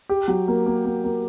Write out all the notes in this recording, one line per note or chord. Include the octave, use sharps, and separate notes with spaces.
G4
F#3
A#3
A#3
A#3
A#3